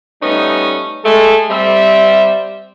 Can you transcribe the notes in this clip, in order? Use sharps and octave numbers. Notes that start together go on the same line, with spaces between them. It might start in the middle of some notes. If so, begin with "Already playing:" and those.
G3 A3 B3 C#4 D#4
G#3 A3 A4
G3 C4 E5